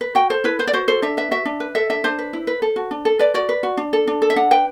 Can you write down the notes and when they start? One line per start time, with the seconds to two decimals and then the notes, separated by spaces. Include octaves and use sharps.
0.01 B4
0.15 F#4 G5
0.30 A4 C5
0.44 E4 B4
0.59 B4 C5
0.67 D5
0.73 F#4 C5
0.88 A4 C5
1.02 D4 E5
1.17 B4 E5
1.31 F#4 E5
1.45 D4
1.60 B4
1.75 A4 E5
1.90 D4 E5
2.04 D4 C5
2.19 B4
2.33 E4
2.47 B4
2.62 A4
2.76 F#4
2.91 D4
3.05 A4
3.19 B4 D5
3.34 F#4 D5
3.49 B4
3.63 F#4
3.77 D4
3.93 A4
4.07 D4
4.22 A4
4.30 E5
4.36 D4 F#5
4.51 B4 G5